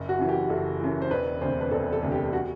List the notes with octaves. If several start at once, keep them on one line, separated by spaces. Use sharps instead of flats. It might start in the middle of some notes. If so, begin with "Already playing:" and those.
Already playing: F#1
F#4
F#2 E3
G4
F#1 A4
F#2 E3
C5
E1 B4
D2 C3 C5
B4
E1 A4
A4
D2 C3
G4
F#4